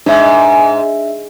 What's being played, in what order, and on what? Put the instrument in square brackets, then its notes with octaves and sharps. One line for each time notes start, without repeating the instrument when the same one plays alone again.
[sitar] G#2 [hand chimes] D4 E5